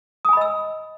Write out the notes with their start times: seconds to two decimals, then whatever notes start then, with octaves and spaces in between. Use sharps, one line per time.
0.25 D#6
0.29 G#5
0.33 B5
0.37 D#5
0.41 E6